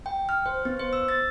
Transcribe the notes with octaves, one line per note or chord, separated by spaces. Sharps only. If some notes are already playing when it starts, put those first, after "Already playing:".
G5
F6
C5
B3
C5
E6
A6